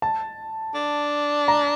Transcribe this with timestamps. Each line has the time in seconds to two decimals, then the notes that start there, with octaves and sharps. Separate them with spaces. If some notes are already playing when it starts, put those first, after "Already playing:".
0.02 A5
0.75 D4
1.48 A#5